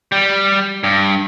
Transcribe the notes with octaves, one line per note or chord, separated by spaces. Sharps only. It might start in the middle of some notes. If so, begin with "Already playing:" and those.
G3
G2